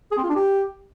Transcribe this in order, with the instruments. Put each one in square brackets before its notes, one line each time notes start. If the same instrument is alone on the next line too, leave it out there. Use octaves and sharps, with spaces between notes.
[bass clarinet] G#4
C4
F4
D4
G4